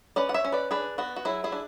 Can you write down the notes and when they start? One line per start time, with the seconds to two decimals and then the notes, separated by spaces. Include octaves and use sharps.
0.16 C#4 B4 D5
0.29 F#5
0.34 C#5 E5
0.45 C#4
0.52 B4 D5
0.71 D4 G#4 B4
0.98 B3 F#4
1.16 F#4
1.25 F#3 E4 G#4
1.44 E4 G#4
1.52 D4